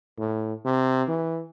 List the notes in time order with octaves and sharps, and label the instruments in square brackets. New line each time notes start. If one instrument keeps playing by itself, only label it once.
[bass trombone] A2
C3
E3